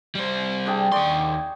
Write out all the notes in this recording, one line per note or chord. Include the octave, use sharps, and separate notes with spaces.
G3 C5
D4 G#4 G5
D#2 D5 C6 C#6